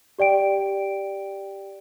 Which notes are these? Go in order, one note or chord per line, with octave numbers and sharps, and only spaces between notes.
G4 D5 G5 D7